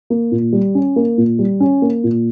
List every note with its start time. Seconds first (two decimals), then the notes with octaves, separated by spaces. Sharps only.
0.10 A#3
0.32 A#2
0.53 G3
0.75 C#4
0.96 A#3
1.18 A#2
1.39 G3
1.60 C#4
1.82 A#3
2.04 A#2